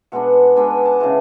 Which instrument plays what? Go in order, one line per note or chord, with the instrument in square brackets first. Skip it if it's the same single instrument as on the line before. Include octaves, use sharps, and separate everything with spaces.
[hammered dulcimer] B2 G#3 B3 D4 F#5
B2 G#3 B3 D4 G5
G#5
A5
C#3 E3 G#3 G#5